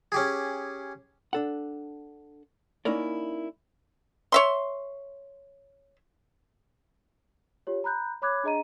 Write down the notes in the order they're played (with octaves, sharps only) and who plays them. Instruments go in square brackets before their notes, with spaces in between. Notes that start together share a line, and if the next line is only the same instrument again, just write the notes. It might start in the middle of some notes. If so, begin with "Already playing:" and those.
[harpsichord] C#4 G4 G#4
[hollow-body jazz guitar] D4 A4 F#5
A#3 C#4 D#4 E4 A#4 D5
[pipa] C#5 E5 C6
[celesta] F4 G4 C#5
A#5 B5 F#6 G6
C#5 B5 D6 F#6 G#6
D4 G#4 D#5 A#5 D#7